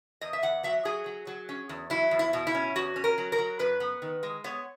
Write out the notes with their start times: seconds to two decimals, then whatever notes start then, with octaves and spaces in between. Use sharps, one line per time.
0.21 E2 D#5
0.33 E5
0.43 E2 F#5
0.63 F#3 E5
0.85 F#3 G#4
1.06 F#3
1.27 F#3
1.49 C#4
1.69 E2
1.90 F#3 E4
2.11 E2
2.19 E4
2.33 B2
2.47 E4
2.55 C#4
2.75 E2 F#4
2.96 C#4
3.04 A#4
3.18 F#3
3.32 A#4
3.38 F#3
3.59 F#2 B4
3.80 B3
4.02 D#3
4.23 G#3
4.44 B3 C#5